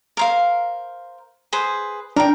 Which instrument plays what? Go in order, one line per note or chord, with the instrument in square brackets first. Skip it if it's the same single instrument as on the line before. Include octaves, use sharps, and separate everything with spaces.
[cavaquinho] A#4 C5 F5
G#4 B4 C5
[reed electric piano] D4 [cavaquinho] A#4 G5